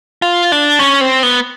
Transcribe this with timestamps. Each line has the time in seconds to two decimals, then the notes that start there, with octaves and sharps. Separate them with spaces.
0.22 F4
0.52 D4
0.79 C#4
1.01 C4
1.23 B3